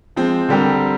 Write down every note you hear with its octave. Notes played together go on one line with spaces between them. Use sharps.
F3 G#3 C4
D3 G3 C4 G4 A#4